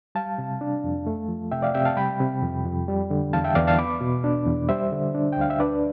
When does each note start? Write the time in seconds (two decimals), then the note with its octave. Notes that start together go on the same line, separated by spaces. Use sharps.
0.15 G3 F5 A5
0.38 C3
0.61 D4
0.84 F2
1.07 A3
1.28 F3
1.52 C3 E5 G5
1.62 D5 F5
1.74 C3 E5 G5
1.85 F5 A5
1.97 G3 G5 B5
2.20 C3
2.42 F2
2.65 F2
2.88 G3
3.10 D3
3.33 E2 F5 A5
3.44 E5 G5
3.55 E2 D5 F5
3.67 F5 A5
3.78 B3 B5 D6
4.01 B2
4.24 D4
4.46 E2
4.69 G3 C5 E5
4.92 D3
5.14 D4
5.32 G5
5.37 D2 F5
5.50 E5
5.60 D4 B4 D5